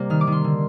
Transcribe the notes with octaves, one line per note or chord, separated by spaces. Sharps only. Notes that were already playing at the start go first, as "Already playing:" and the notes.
Already playing: C3 G3 A#3
D#3 F6
D6
D#3
C6
D3